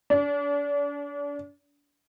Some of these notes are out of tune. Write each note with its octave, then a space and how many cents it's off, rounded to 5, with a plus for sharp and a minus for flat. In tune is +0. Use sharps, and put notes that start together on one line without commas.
D4 -35